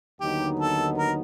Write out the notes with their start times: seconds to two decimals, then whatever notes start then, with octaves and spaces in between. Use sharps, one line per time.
0.21 D#2 D3 F#3 B3 D#4 G4
0.60 A4
0.98 A#4